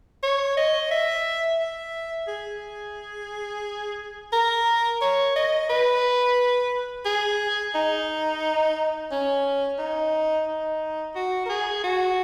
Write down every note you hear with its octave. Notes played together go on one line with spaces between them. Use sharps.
C#5
D#5
E5
E5
G#4
A#4
C#5
D#5
B4
G#4
D#4
C#4
D#4
D#4
F#4
A#4
G#4
F#4